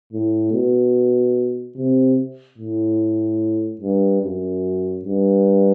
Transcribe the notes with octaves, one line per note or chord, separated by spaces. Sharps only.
A2
B2
C3
A2
G2
F#2
G2